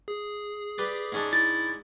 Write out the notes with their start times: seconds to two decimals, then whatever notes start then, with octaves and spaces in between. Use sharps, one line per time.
0.08 G#4
0.78 G4 B4 D5
1.12 G#2 C#4 D4
1.33 E4 A6